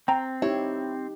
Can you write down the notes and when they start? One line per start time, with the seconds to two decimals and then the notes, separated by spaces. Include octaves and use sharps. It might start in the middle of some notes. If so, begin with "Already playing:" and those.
0.08 C4 G5 A#5
0.42 D#4 E4 G4 C#5